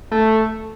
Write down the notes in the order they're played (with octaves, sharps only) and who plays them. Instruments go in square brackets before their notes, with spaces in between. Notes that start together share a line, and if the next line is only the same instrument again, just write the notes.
[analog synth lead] A3